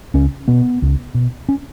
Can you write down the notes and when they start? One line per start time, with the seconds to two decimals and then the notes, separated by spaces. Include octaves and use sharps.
0.14 C#2 C#4
0.48 B2 B3
0.82 C#2
1.14 B2
1.49 C#4